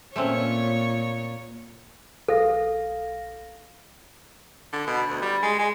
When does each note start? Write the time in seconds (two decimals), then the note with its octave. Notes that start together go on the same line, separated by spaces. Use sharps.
0.16 A#2 A3 C4 C#4 C#5
2.28 B1 A4 F5 A#6
4.73 D3
4.87 B2
5.08 D2
5.22 G3
5.43 G#3
5.59 G#3